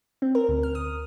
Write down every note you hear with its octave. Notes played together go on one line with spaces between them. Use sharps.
C4
A#4
D2
F6
D#6